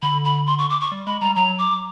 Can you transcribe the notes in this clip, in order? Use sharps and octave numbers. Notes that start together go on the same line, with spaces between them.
D3 B5
B5
C6
C#6
D6
C#6
G3
G#3 B5
G3 A#5
F#3 A#5
D6